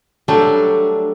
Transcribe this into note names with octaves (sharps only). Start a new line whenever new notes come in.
F#3 G3 A3 D4